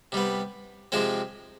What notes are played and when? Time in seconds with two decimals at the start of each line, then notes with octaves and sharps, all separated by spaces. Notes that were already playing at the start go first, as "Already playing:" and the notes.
0.12 C3 G3 B3
0.92 C3 F3 G#3 C4